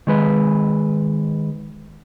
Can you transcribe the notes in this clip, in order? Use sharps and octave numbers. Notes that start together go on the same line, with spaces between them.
D#3 G#3 B4